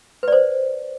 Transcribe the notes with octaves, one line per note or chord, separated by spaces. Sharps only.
B4 C5 D5